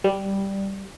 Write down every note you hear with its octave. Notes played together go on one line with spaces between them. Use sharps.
G3